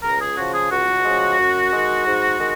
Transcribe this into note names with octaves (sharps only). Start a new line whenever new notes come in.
C#2 A#4
G#4
C#3 F3 F#4
G#4
C#2 F#4
C#3 F3 G#3
F#2
D#3 G#3
G#2
D#3 G#3